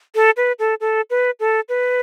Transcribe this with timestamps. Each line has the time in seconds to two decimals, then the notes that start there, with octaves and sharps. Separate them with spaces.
0.15 A4
0.37 B4
0.59 A4
0.81 A4
1.10 B4
1.40 A4
1.69 B4